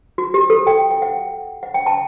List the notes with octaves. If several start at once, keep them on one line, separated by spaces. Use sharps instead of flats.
F#4
G4
A4
G5
G5
F#5
F#5
G5
A5